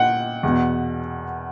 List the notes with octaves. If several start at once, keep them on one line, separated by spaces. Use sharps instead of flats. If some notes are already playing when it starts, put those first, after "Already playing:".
Already playing: A#2 F#5 G5
E2 B2